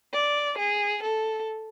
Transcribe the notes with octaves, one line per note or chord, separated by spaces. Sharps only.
D5
G#4
A4